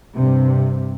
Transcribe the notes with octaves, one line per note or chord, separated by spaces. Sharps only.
G2 C3